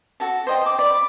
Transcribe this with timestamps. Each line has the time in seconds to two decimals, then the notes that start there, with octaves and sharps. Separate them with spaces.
0.20 F#4 A4 A5
0.47 C5 D#5 G5
0.66 D6
0.79 D5 B5